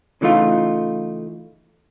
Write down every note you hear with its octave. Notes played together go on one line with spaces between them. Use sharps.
C#3 E3 A3 D#4 F4